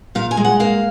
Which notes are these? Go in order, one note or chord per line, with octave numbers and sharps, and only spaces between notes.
A#2 F5
G#5
G#3
F#5
A#3 F5